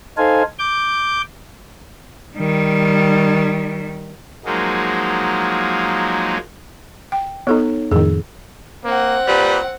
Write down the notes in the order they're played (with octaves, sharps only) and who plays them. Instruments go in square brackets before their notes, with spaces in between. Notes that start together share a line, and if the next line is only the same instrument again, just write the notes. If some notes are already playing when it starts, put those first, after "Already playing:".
[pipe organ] D#4 A4 C5 F5 G#5
D6 G6
[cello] D#3 G3
[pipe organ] F3 F#3 G#3 A#3 D#4
[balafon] G5
[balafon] B3 A4 [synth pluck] D#4 C#5
[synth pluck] F2 A2 D#3 [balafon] G#4
[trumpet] A#3 [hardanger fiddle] C4 F#5
[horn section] A#2 G3 [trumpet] B4